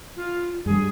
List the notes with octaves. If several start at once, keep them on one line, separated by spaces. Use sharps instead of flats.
F4
G2 G3 G#4